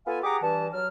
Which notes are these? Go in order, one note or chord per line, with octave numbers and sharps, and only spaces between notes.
B3 F4 A4 F5 G#5
G4 G#4 F#5 A#5 D6 D#6
G2 E3 A5
F#3 F6